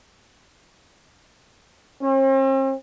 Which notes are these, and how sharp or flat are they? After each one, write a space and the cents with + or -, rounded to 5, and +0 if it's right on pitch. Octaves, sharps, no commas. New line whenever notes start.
C4 +45